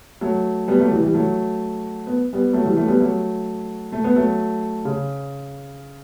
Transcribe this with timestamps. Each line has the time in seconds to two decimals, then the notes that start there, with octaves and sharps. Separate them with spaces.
0.21 F#3 A3
0.68 G3 B3
0.80 F#3 A3
0.91 E3 G3
1.03 E3 G3
1.14 F#3 A3
2.07 B3
2.33 G3 B3
2.53 F#3 A3
2.64 E3 G3
2.77 F#3 A3
2.88 G3 B3
3.00 F#3 A3
3.92 A3
4.04 B3
4.16 F#3 A3
4.85 C#3